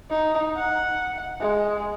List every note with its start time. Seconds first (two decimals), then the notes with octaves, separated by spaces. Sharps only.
0.11 D#4
0.56 F#5
1.41 G#3